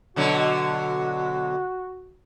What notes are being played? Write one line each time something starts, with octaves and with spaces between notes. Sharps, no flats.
B2 D3 F#3 F#4